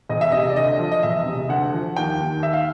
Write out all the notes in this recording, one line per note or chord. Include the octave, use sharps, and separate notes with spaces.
E1 D#5
E5
C3 D#5
D5
D2 D#5
F3
D#5
E1 E5
C3
D2 F#5
F3
D#2 G5
D#2
D#3 E5
F5